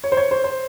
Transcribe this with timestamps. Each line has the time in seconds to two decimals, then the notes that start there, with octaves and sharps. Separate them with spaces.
0.04 C#5
0.12 C5
0.17 C#5
0.31 C5
0.44 C5